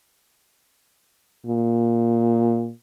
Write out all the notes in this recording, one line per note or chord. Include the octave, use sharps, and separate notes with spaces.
A#2